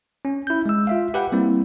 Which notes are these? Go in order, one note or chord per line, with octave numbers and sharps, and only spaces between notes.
C#4
E4 G6
G#3 E6
F4 E5 F5
G4 B4 F#5 G5
G3 A#3 C4 E4